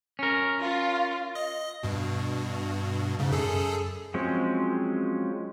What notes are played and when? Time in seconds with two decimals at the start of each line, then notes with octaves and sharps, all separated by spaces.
0.19 C#4 A#4
0.61 F4
1.35 D#5
1.83 G2 B2
3.19 G#2 C#3
3.32 F#2 G#4 A4
4.14 F3 F#3 G#3 C4 C#4